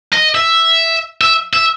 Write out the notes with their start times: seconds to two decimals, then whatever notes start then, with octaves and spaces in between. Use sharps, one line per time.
0.13 D#5
0.35 E5
1.21 E5
1.54 E5